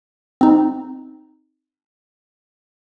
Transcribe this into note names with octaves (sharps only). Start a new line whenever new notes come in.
C4 D#4